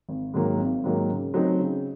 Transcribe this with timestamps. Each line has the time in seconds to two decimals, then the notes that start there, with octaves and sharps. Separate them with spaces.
0.09 G#1
0.34 G#2 D#3 F#3 A#3
0.59 G#1
0.84 G#2 D#3 F#3 A#3
1.09 C#3
1.34 F#3 A3 C4 D#4
1.59 C#3